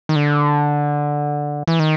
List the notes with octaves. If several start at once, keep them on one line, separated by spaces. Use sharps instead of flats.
D#3
D3
E3
D#3